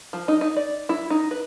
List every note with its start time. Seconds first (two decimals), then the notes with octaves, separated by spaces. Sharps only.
0.13 F3
0.28 D#4
0.41 D#4
0.57 D5
0.89 E4
1.10 D#4
1.31 B4